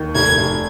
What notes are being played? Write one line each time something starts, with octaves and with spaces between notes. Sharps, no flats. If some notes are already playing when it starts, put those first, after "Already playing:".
Already playing: D#2 D#3
F1 G#6
F1